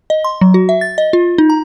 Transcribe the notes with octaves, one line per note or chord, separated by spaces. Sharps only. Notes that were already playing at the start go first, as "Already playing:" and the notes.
D#5
C6
F#3
F#4
E5
A6
D#5
F4
D#4
A#5